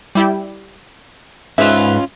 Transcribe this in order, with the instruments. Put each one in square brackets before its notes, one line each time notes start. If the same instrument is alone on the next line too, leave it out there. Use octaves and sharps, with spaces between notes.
[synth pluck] G3 E4 G4
[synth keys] G#2 B4 [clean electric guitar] C#4 F4 [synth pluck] E5